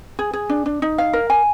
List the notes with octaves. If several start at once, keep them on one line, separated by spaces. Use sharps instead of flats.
G#4
G#4
D4
D4
D#4
F5
A#4
G#5